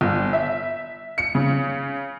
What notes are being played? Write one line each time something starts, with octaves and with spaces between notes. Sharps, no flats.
G1
E5
C#7
C#3